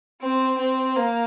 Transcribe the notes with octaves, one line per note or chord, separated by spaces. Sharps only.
C4
C4
A#3